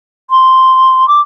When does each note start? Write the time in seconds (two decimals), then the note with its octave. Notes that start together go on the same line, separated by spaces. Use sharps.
0.30 C6
1.07 D6